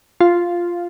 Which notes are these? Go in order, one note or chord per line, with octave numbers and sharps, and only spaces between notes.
F4